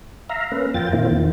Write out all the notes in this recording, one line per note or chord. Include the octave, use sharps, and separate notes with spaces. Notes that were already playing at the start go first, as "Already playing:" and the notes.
E5 F5 A#5
A#3 C#4 B4
F2 F4 G5 A6
A#2 D#3 A#3 C4 E4 F4
E2 D#3